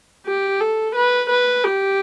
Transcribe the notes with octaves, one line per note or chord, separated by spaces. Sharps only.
G4
A4
B4
B4
G4